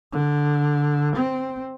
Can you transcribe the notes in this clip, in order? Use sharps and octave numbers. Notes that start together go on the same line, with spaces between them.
D3
C4